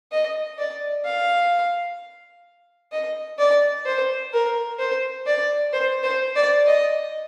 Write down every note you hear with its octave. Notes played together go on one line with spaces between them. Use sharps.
D#5
D5
F5
D#5
D5
C5
A#4
C5
D5
C5
C5
D5
D#5